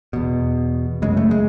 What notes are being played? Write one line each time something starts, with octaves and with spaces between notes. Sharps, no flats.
E2 B2
F#2 C#3 G#3
A3
G#3